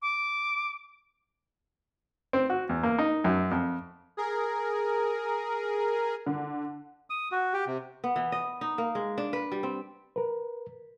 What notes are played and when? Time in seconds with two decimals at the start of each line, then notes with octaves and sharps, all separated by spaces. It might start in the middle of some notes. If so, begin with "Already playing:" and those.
0.02 D6
2.33 C4
2.50 F#4
2.69 E2
2.83 A#3
2.98 D#4
3.24 F#2
3.51 F2
4.17 G#4 A#4
6.27 D3
7.10 D#6
7.32 F#4
7.54 G4
7.67 C3
8.04 B3
8.16 E3
8.32 D#5
8.61 D#4
8.78 A#3
8.95 G#3
9.18 D4
9.33 B4
9.52 G3
9.63 C4
10.16 A#4 B4